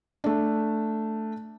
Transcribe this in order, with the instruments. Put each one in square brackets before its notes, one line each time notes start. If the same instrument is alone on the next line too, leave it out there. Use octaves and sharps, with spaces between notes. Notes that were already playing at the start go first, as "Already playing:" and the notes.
[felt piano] A3 D4